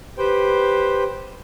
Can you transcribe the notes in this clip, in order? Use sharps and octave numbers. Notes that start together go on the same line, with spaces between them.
G4 B4 C5 G5